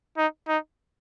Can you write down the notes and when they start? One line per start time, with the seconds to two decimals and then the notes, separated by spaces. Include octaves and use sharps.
0.17 D#4
0.48 D#4